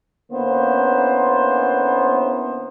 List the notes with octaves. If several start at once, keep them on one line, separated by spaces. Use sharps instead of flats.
D3 A#3 B3 C#4 E4 C5